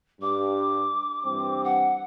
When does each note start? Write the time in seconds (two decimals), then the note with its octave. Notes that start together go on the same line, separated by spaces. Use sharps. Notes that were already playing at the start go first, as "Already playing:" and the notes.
0.21 G2 D6
1.24 G2 E3 C4
1.64 F#5